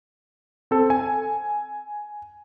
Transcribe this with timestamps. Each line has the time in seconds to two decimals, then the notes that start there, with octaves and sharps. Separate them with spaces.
0.71 C4 A4
0.90 G#5